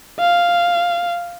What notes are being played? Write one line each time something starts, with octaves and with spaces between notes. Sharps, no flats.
F5